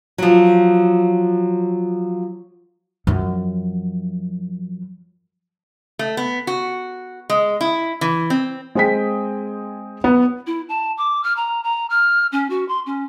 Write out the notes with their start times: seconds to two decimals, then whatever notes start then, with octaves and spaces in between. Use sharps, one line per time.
0.18 F3 F#3
3.07 F#2 F3
5.99 A3
6.17 B3
6.47 F#4
7.30 G#3
7.61 E4
8.01 E3
8.30 C4
8.75 G#3 C4 G#4 G5 B6
10.04 B3
10.47 E4
10.69 A5
10.98 D6
11.24 F6
11.36 A#5
11.64 A#5
11.90 F6
12.32 C#4
12.50 F#4
12.69 C6
12.86 C#4